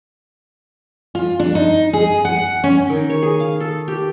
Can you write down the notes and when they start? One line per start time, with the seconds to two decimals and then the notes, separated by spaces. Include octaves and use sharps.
1.15 F4
1.40 D4
1.55 D#4
1.93 G#4
2.25 F#5
2.64 C#4
2.90 D#3
3.09 C#5
3.22 G#4
3.40 F5
3.60 A4
3.88 G4